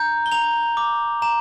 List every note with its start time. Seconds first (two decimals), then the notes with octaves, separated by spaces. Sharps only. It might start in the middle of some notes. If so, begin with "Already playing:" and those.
Already playing: A#5 G6
0.26 G7
0.32 A#5 F7
0.77 D6
1.22 A#5 E7